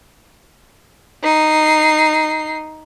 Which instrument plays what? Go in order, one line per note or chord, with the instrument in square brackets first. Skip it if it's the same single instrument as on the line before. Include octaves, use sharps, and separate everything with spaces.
[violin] D#4 C7